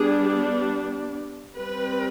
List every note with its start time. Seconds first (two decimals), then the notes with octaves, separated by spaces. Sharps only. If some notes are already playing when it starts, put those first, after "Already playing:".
Already playing: G3 B3 D4 G#4
1.57 G3 C4 B4